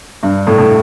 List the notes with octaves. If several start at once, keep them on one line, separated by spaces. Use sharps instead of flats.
G2
A2
A2